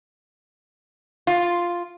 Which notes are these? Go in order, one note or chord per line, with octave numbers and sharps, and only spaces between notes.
F4